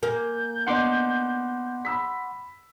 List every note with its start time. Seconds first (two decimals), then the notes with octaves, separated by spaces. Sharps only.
0.03 A#3 G#5 G6
0.67 B3 D4 D#5 F#5 C6 D6
1.85 B5 E6 B6